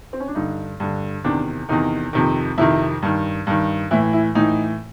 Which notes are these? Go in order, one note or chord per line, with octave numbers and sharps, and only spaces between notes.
C4
C#4
D4
G2 D3 D#4
G2 D3
E2 C3 D#3 D4
E2 C3 D#3 D#4
F2 C3 D#3
F2 C3 D#3 E4
G2 D#3
G2 D#3
A2 E3 E4
E4
A2 E3 D#4